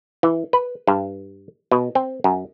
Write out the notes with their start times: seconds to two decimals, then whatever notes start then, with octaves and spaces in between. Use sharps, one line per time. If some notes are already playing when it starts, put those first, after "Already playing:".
0.23 E3
0.53 B4
0.88 G2
1.72 B2
1.95 C4
2.24 F#2